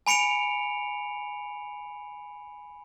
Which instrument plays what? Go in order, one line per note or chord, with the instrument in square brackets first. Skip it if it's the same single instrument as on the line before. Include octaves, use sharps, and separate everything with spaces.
[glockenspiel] G#5 B5 C#7 D7 F7